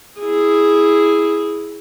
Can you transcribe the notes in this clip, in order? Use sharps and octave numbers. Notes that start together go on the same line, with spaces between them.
E4 G#4